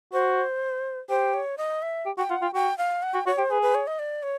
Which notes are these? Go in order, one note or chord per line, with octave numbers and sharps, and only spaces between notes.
F#4 C5
G4 C5
C#5
D#5
E5
G4
F#4 G5
F4 F#5
F4 G5
F#4 G5
F5
F#5
F#4 G5
F#4 C#5
G4 C5
G#4 B4
B4
C#5
D#5
D5
C#5